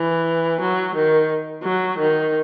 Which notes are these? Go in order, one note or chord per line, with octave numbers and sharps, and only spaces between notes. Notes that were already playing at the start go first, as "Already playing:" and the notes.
Already playing: E3
F#3
D#3
F#3
D#3